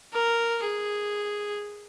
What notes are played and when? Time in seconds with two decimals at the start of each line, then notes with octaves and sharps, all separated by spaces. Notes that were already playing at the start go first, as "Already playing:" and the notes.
0.13 A#4
0.64 G#4